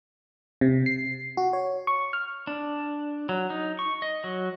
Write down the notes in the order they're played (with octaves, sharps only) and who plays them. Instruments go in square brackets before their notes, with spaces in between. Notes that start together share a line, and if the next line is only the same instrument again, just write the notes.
[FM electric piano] C3
C7
F#4
C#5
C#6
F6
[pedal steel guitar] D4
F#3
D#4
C#6
D#5
F#3